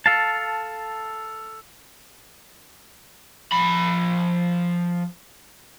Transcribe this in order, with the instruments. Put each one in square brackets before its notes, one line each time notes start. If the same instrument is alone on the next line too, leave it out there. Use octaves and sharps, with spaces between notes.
[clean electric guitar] A4 F5 A5
[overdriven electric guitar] F3 B5